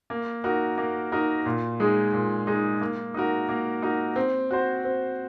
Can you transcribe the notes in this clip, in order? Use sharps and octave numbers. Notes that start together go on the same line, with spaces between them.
A#3
D#4 F#4 A#4
A#3
D#4 F#4 A#4
A#2
G#3 D#4 G#4
A#2
G#3 D#4 G#4
A#3
D#4 F#4 A#4
A#3
D#4 F#4 A#4
C4
F#4 C5
C4